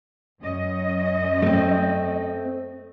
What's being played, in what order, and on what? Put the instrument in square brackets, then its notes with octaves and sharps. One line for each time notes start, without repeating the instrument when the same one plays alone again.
[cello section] F#2 C#4 D#5
[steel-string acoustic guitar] A3 C4